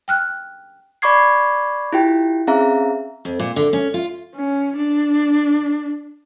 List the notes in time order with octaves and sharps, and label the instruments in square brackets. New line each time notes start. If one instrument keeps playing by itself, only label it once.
[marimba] G5 F6 F#6
[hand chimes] D5 B5 C#6 D6 G#6 C7
E4 F4 G4 G5
C4 C#4 G#4 E5 F5 A#5
[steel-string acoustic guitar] F2
A#2
D3
C#4
F4
[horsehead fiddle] C#4
D4